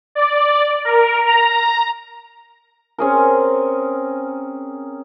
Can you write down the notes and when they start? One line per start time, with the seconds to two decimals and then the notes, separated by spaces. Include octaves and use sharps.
0.15 D5
0.85 A#4
1.26 A#5
2.98 C4 C#4 G#4 A#4